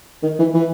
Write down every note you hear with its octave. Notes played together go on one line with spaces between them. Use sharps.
D#3
E3
E3